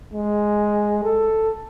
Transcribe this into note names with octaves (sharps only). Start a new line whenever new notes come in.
G#3
A4